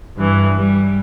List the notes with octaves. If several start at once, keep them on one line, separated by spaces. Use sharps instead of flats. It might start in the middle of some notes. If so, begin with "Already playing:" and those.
G2 E3
G3